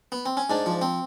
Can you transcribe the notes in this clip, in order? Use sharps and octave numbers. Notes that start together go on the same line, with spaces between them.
B3
C4
C#4
G#2 D4
F3
C4